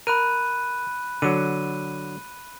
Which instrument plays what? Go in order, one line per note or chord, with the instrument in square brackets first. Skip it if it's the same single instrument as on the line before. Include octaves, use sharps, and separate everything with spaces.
[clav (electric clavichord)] A#4 [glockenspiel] B5 F#6 D#7
[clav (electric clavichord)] D3 F#3 [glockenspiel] D#7